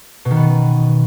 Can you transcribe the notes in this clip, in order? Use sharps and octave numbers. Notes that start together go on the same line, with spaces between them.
B2
D#3
B3